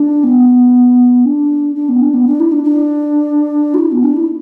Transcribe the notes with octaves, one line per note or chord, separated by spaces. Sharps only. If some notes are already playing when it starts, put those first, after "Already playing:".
Already playing: D4
B3
D4
D4
B3
D4
B3
D4
E4
D4
D4
F#4
E4
B3
D4
E4